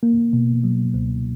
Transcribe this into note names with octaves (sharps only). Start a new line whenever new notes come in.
A#3
B2
F#3
C#2